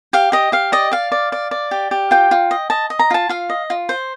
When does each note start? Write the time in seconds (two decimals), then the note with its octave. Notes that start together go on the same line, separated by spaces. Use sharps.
0.13 G4 F5
0.32 G4 D#5
0.52 G4 F5
0.72 D5 D#5
0.91 D5 F5
1.12 D5
1.32 D5
1.51 D5
1.71 G4
1.91 G4
2.11 F4 G5
2.31 F4
2.51 D#5
2.70 D#5 A5
2.90 D#5
2.99 A#5
3.11 F4 A5
3.29 F4 F5
3.50 D#5
3.70 F4
3.89 C5